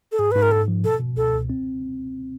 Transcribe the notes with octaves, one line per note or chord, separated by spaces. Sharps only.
A4
G#2 G#4
G#2 B4
A#4
G#2 A4
F3
B2 A4
B2
C#2 A4
C#2
C4